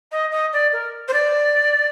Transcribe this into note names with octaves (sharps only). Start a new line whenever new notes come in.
D#5
D#5
D5
A#4
C5
D5